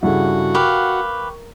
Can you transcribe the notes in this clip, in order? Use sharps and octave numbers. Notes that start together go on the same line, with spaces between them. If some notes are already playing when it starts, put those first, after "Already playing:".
G2 C#3 E4 F#4 A4 F#5
G4 A#4 B4 F5 C#6